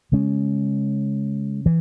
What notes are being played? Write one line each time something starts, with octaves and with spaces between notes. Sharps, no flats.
C#3 G#3 C#4
E3